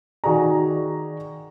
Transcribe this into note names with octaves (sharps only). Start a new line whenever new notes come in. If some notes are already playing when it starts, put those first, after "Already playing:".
D#3 F#4 G#4 D5 A#5